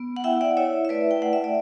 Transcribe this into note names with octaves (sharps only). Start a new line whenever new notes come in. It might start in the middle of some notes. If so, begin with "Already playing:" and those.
Already playing: B3
F#5
E4 E5 G5
D5 F#5
E4 C#5 E5
E5
A3 B4 D5
G5
A3 F#5
E5
D5